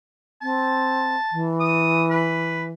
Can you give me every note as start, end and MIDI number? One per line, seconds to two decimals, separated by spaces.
0.42 1.15 60
0.42 1.48 81
1.31 2.71 52
1.60 2.05 87
2.10 2.64 71